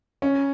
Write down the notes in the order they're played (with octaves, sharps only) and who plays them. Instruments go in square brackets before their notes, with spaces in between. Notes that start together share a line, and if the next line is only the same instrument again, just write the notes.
[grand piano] C#4